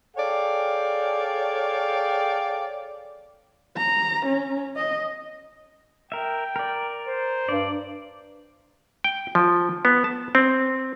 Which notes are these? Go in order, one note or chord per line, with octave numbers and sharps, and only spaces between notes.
G#4 A4 C#5 D5 F5 G5
A#5
C#4
D#5
A#4 E5 G5
A#4 D5
C5
G2 D5
G5
F3
B3
A5
C4